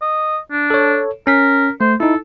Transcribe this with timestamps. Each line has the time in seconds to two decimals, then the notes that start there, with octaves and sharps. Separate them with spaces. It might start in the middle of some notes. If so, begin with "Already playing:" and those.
0.02 D#5
0.52 D4
0.70 A4 C#5
1.27 C#4 A#4 B6
1.81 A3 C5
2.00 D#4 E4 A4